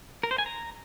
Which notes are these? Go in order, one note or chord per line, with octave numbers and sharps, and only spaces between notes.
A#4
C5
G#5
A#5